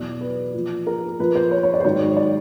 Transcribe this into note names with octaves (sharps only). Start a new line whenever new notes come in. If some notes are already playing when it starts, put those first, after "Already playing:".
Already playing: E2 B2 F#3 D5
B4
A#2 F3
A#4
A#2 F3 B4
C5
C#5
C#5
D5
C5
G#2 D#3 F#3 C#5
D5